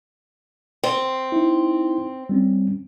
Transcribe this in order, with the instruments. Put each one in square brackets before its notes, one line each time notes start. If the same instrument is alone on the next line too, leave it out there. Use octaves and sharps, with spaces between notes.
[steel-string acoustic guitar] C4
[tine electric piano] D#4 E4
G3 C4 C#4